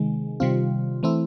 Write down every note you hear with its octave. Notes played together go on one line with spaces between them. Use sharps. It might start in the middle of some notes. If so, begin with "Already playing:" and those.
Already playing: C3 D#3 G#3
C3 D#3 G3 C4 F4
E3 A3 C4 E4